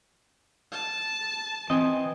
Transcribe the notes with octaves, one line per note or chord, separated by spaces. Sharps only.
A5
E3 C4 D#5 G#5